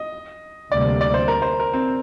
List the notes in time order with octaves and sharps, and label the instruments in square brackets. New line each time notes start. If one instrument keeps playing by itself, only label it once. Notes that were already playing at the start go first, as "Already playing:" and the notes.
Already playing: [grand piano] D#5
[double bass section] D2 C3 G3 A#3 [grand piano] D5
[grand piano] D5
C5
A#4
C5
A#4
C4